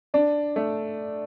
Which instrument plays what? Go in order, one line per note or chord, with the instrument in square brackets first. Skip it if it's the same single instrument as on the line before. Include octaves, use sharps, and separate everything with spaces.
[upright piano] D4 [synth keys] D5
[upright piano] A3